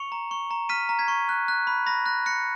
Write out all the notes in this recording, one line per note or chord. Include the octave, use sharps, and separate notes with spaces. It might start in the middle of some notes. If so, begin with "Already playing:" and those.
Already playing: C#6 C#7 F7
A#5
C#6
A#5
F6 B6 D#7
A#5
G#6 B6
C#6
F#6
F#6
B5
B5 A#6
F#6 A#6
F#6 A#6 C#7